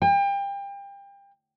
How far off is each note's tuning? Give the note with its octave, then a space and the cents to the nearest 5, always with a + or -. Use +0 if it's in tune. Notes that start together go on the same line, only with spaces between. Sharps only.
G5 +30